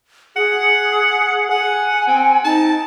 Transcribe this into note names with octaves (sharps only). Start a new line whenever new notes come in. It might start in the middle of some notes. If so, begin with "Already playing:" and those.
G#4 F#5
F#5 G#5
C4
D#4 A5